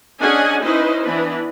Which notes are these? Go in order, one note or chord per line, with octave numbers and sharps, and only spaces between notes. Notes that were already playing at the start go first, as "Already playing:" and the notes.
C#4 D4 G#4 D#5 F#5 G#5
C#4 D#4 E4 B4 C5 D#5
E3 B3 D4 B4